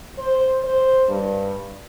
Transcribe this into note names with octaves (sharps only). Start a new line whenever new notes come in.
C5
C5
G2